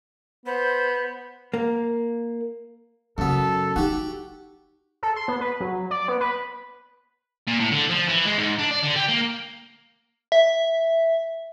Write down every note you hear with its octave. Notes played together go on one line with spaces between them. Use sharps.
B3 C5
A#3
F#2 C#3 B3 A4
D#4 F#4 G4
A4
C6
B3
B4
F#3
D5
B3
B4
A#2
A2
D3
F3
E3
G#3
G#2
D4
D5
D3
G4
A#3
E5